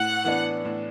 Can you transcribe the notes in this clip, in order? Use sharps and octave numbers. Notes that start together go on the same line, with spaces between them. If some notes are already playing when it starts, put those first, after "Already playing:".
Already playing: A2 F#5
E3 B3 D4
A2